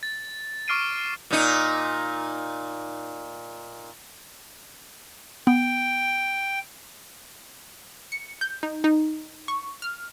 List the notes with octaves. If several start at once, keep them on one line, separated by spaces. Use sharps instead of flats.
A6
C#6 D6 F6 C7 D7 D#7
A#2 D#4
B3 G5
C#7
G6
D#4
D#4
C#6
F6